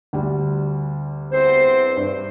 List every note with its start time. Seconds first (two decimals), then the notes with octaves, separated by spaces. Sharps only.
0.13 D2 G3
1.32 E2 C4 C5
1.97 G2